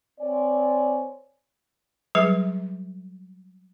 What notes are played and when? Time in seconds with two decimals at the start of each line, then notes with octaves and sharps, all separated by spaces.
0.20 C4 C#5 D5 G#5
2.15 F#3 G3 G#4 B4